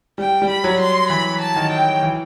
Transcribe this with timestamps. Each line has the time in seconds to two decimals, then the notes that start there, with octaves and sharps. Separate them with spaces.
0.18 G3 G5
0.42 G3
0.49 B5
0.64 F#3
0.80 C6
1.10 E3 B5
1.41 A5
1.56 D#3
1.71 G5
2.03 E3